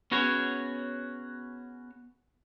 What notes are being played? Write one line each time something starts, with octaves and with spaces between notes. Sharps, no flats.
B3 C#4 F#4 G#4 C#5